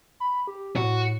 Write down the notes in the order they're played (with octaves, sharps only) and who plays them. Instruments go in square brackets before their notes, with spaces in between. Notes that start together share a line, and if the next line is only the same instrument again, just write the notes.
[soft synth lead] B5
G4
[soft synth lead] A2 [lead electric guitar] F#4